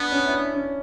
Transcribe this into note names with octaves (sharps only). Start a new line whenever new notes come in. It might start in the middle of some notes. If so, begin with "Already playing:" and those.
Already playing: B3 D4
C#4
E4
D4
C#4